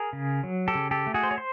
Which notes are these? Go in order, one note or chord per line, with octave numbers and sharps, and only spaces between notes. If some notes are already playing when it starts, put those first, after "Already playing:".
Already playing: G#4 A#4
C#3
F#3
G4 A4
C#3
G4 A4
A3
F#4 G#4
C5
C#5
C5